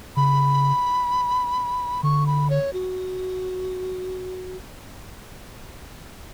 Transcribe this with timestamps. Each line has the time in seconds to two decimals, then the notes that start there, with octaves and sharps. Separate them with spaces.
0.16 C#3 B5
2.03 D3 C#6
2.27 B5
2.50 C#5
2.73 F#4